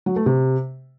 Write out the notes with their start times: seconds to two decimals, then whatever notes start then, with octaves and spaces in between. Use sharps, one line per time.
0.06 F#3
0.16 A3
0.26 C3